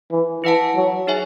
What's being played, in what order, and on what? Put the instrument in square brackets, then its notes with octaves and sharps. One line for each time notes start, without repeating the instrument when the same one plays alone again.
[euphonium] E3
[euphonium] E3 [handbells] E4 B4 F#5 A5
[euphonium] F#3
[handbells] D#4 G#4 C#5 E5 G#5